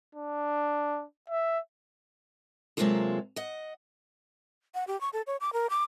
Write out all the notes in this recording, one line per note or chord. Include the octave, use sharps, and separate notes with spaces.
D4
E5
C3 F#3 G#3 A#3 F4 A4
D#5 F#5
F#5
G4
C#6
A4
C#5
D6
A#4
D6